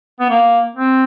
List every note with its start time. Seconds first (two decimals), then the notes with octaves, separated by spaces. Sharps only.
0.20 B3
0.30 A#3
0.75 C4